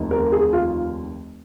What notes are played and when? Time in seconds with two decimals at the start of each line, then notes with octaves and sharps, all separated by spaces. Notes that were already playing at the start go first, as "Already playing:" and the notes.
Already playing: F1 D#2 D#3
0.11 A#4
0.32 G#4
0.53 F4